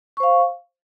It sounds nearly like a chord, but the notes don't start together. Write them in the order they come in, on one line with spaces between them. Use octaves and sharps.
C#6 C5 F5